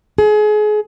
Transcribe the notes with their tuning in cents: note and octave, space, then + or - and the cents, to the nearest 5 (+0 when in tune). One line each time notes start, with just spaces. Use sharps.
G#4 +30